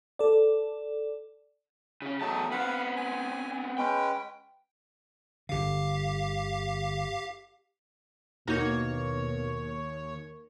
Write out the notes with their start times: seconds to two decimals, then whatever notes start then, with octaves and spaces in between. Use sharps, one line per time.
0.19 A4 D5
2.02 C#3 C#4
2.21 E2 F#3 A3 D#4 A5
2.51 B3 C4 F5 F#5 B5
2.96 G#5
3.78 G#3 C#4 B4 G5
5.49 G1 D3 G4 F5
8.47 D#2 B2 A#3 D#4 F#4 C#5